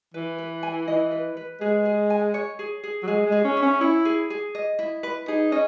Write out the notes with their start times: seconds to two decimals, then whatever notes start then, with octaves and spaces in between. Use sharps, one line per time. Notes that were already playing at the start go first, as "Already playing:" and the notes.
0.14 E3 B4
0.38 B4
0.63 G#5
0.88 E3 D#5
1.12 B4
1.37 B4
1.61 G#3 G#4
1.85 G#4
2.10 G#5
2.34 C#5
2.59 G#4
2.84 G#4
3.03 F#3
3.08 G#3 G#4
3.26 G#3
3.32 G#4
3.44 C#4
3.57 E5
3.62 C#4
3.81 E4 C#5
4.05 G#4
4.30 G#4
4.55 D#5
4.79 E4
5.03 B4
5.28 D#4 G#4
5.52 C#4 D#5